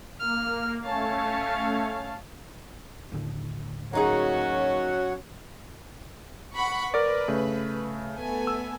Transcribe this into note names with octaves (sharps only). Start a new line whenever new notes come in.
A#3 F6
A3 C#4 C#5 F5 A5
D#2 A2 D3
F#3 A#3 C#4 D#4 F#4 G#4 C#5 F#5
F#5 B5 C#6
A#4 B4 D5
C#3 A3
A3 B3 G#5
E6